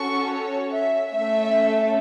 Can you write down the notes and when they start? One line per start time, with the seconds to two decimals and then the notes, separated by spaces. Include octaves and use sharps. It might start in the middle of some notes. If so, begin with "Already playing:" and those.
Already playing: C#4 F#4 A4 C#6
0.31 C#5
0.72 E5
1.12 A3 C#4 A4 E5